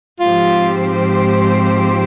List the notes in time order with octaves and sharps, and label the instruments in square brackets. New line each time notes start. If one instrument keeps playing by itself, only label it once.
[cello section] G#2 F3 C4 G4 C5 [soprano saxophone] F4